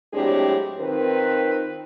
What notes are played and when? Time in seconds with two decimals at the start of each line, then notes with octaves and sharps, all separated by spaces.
0.14 A2 F#3 G#3 C4 D4 G4
0.79 D#3 C4 D#4 F4 A#4 B4